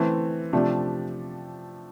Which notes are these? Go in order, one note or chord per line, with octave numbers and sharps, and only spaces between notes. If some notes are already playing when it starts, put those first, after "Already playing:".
Already playing: E3 A3 C4
C3 F3 A3 D4 G4